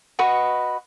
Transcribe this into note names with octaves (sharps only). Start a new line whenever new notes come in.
F#4 B4 D#5 C#6